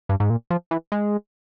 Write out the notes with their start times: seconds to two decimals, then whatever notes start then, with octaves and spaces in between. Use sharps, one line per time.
0.09 G2
0.20 G#2
0.30 A#2
0.50 F3
0.71 E3
0.92 G#3